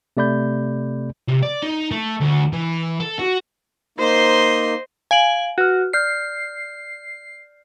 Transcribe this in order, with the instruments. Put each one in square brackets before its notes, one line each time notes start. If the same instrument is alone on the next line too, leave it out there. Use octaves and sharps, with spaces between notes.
[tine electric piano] C3 A3 D5 B5 G6
[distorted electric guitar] C3
D5
D#4
A3
D2
E3
A4
F#4
[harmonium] A#3 D#4 [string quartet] C5 D#5 C6
[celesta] F5 D7 F#7 [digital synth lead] G#5
[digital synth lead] F#4 [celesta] B4 F6
[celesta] D5 F6 G6 [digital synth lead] C7